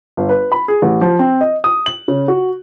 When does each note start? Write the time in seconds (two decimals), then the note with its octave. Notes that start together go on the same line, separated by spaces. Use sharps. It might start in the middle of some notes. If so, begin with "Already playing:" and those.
0.17 G1
0.29 B4
0.52 B5
0.68 G#4
0.82 A1
1.01 F3
1.19 C4
1.41 D#5
1.64 D#6
1.86 F#7
2.08 C#3
2.28 F#4